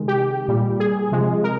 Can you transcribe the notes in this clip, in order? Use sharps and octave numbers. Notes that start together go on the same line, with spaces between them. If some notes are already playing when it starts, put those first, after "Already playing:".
Already playing: C3 D#3 G#3
G4
A#2 G3
G#4
C3 F3 G#3
A#4